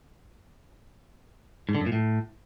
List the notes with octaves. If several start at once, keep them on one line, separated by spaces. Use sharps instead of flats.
G#2
D3
F#2
A#2
A2